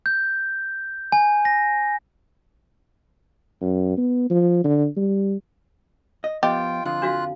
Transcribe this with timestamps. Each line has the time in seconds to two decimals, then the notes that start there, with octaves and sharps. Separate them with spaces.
0.06 G6
1.12 G#5
1.45 A#6
3.61 F#2
3.98 B3
4.30 F3
4.64 D3
4.97 G3
6.24 D#5
6.43 F3 B3 F4 G4 D#5 G5
6.85 F2 D3 F3 F4 F#6
7.02 D4 F#4 F5